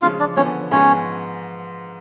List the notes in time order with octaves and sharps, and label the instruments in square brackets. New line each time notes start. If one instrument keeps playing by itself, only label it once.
[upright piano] C#3 F3 G#3 C#4 [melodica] F4 F5
[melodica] D4 D5
[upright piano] D3 F3 B3 [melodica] C#4 C#5
[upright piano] G#2 F3 G#3 B3 [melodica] C#4 C#5